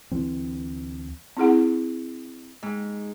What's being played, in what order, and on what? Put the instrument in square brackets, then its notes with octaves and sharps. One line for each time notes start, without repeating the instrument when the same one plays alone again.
[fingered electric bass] D2 E3 C4
[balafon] C4 E4 G#4 F#5
[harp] G#2